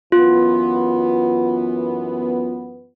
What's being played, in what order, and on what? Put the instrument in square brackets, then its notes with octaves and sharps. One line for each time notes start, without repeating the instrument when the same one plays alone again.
[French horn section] F#2 E3 B3 [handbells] F4